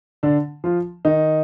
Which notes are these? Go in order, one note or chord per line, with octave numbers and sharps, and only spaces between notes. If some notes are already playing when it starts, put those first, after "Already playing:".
D3 D4
F3 F4
D#3 D#4